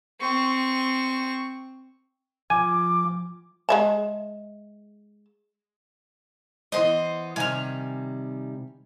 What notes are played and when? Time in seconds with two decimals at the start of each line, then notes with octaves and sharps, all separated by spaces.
0.20 C4 C#6
2.50 F3 G#5 D6
3.69 G#3 E5 A5
6.72 E3 B3 C5 D#5 C6
7.36 C3 D#3 G3 G#5 F6